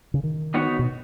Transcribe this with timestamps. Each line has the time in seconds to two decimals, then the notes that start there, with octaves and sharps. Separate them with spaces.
0.14 C#3
0.23 D#3
0.54 B3 D#4 F#4 C#5
0.79 B2